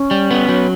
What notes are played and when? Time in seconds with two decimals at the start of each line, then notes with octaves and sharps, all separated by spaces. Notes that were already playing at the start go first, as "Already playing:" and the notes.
Already playing: C#4
0.11 G3
0.31 B3
0.49 F#3